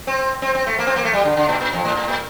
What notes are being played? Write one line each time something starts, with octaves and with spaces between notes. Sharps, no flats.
C4
C4
C4
A3
A#3
C4
A#3
A3
G3
D3
D3
A#2
A#2
F2
A2
A2
A#2